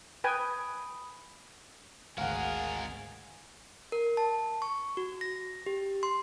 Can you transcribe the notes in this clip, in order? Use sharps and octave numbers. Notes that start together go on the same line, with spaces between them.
B4 G5 G#5 B5 D#6
G#1 D2 G#3 G#4 A#4 F5 F#5
A#4
A5
C#6
F#4
A#6
G4
C6